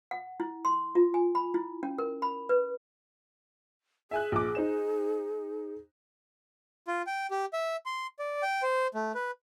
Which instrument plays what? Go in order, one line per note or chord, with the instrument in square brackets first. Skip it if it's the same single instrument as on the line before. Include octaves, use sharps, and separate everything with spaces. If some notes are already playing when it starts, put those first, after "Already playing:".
[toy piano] F#5
E4
C6
F4
G#5
B5
E4
C#4
A#4
B5
B4
[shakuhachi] G#4 [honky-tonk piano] E5 G#5 F#6
[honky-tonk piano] A#1 D6
D#4 C5 E7
[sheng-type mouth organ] F4
G5
G4
E5
C6
D5
G5
C5
A3
B4